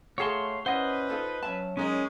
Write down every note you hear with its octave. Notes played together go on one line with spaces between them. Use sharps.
A3 F#4 G#4 C#5 F5 A5 C6
C#4 E4 B4 C5 D#5 F#5
D#4 F4 A4
F#3 C#4 E5 A5
G#3 C#4 D#4 A#4 D#5